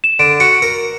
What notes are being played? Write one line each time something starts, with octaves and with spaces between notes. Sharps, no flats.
E7
D3 D7
F#4 C#7
A#4